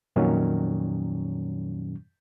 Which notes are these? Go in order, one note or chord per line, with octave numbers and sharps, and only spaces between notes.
F2 A#2 D#3 F#3 C#4